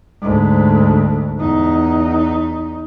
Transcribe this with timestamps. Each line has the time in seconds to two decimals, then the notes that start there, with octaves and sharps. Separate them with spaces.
0.22 D2 G#2
1.39 E2 D#4